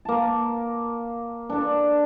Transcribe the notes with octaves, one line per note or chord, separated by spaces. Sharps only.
A#3 A5
D4 A4